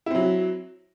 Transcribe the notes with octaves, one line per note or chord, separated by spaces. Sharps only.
F#3 C4 E4